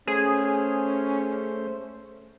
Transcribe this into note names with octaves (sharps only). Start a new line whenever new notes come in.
A3 C#4 G#4 C5